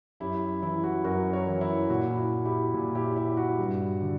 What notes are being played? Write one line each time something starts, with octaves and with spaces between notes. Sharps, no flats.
F#2 E4 G4
E3 E4
F#4
F#2 F#4 A#4
A#4 C#5
E3
E4
A#2 F#4
E4
F#4
E4 G4
A#2
E4 G4
E4
F#4
G2
D3